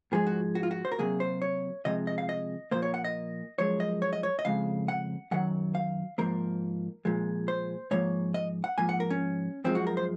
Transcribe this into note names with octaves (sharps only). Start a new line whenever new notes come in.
G#2 F3 G#3 G#4
F#4
F#4
F4
F#4
C5
A#4
C3 F#3 A#3 G#4
C5
C#5
C3 F3 G#3 D#5
D#5
F5
D#5
A#2 F3 A#3 C5
C#5
F#5
D#5
F#2 F3 G#3 C#5
D#5
C#5
D#5
C#5
D#5
F2 C#3 G#3 F5
F#5
F#2 D#3 F#3 F#5
F5
G#2 F3 A#3 A#4
A#2 F3 G#3
C5
G#2 F3 A#3 C#5
D#5
F#5
G#2 F3 A#3 G#5
F#5
A#4
C#4
F#2 F3 G#3 C4
F#4
A#4
C5